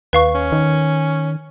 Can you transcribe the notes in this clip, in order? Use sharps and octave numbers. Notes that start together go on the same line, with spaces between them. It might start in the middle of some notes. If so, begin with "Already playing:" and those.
D#2 B4 F5 C#6
C#4
D#3